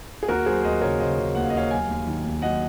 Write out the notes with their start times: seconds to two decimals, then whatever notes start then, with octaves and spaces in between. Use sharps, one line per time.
0.23 G#4
0.28 D#2 F#4 A#4
0.46 F#3 G#4 C5
0.63 D#2 C5 D#5
0.81 C#3 A#4 C#5
0.99 C#3 C5 D#5
1.18 C#3
1.35 D#2 F#5
1.43 F5
1.50 D#5
1.53 D#2 C#5 F5
1.71 F#3 F5 G#5
1.88 D#2
2.07 D#3
2.24 D#2
2.42 F#3 D#5 F#5